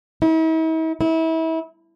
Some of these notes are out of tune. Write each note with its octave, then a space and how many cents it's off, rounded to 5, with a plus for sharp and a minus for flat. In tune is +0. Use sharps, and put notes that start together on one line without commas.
E4 -45
E4 -30